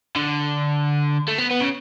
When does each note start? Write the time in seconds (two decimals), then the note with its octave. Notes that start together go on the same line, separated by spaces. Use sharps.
0.16 D3
1.28 A3
1.38 B3
1.51 B3
1.61 C#3